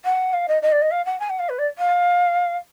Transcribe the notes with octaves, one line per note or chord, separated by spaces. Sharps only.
F#5
F5
D#5
D#5
D5
D#5
F5
F#5
G#5
F#5
F5
B4
D5
F5